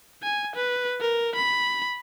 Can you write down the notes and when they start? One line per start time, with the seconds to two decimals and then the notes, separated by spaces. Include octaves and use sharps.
0.23 G#5
0.56 B4
1.01 A#4
1.35 B5